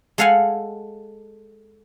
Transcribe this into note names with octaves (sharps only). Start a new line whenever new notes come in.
G#3 A4 F5 F#5 G#5